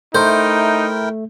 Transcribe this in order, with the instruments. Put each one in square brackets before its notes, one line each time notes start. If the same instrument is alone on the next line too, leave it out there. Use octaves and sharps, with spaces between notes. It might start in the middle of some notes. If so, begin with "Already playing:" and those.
[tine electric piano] A3 [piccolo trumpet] D#4 [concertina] E4 A#4 G5 [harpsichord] C5